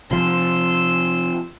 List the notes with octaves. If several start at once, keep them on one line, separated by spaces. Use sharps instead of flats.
C3 F3 C6 E6